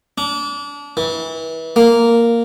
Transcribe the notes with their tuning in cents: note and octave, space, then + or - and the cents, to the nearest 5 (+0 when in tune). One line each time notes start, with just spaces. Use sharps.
D4 -30
E3 -30
A#3 -5